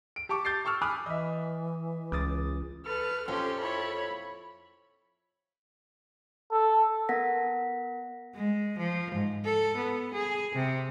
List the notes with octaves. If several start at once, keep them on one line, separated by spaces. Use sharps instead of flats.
D7
G4 A5 C#6 D6
G6 A6 C7
A5 C#6 E6 F6
G#5 B5 D6 D#6 F6 F#6
E3 D#5 E5
C#2 D6 D#6 A6
A4 B4 F6
F2 C#4 G4 A4 C6
E4 C#5 B5
A4
B3 A#4 F#5 A#6 B6
G#3
F3
G#2
A4
B3
G#4
C3